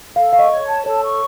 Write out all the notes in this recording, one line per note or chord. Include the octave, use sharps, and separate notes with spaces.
A4 F5
F5 C#6
D#5
C#5
A5
A4 C#5
C#6